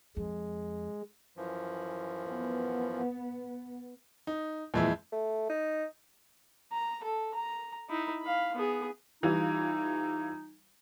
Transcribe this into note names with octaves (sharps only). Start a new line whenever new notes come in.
F2 G#3
F#2 E3 F3
B3
D#4
F2 A#2 E3 G#3 E4
A3
D#4
A#5
A4
A#5
D#4 E4
F5 B5
B3 G#4
E3 G3 D#4 F4